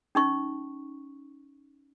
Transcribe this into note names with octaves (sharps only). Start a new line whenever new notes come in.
C#4 D#4 C#6